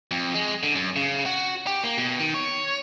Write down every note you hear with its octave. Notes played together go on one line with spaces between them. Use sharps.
F2
G#3
D3
F#2
C#3
F#4
G4
A#3
B2
D#3
C#5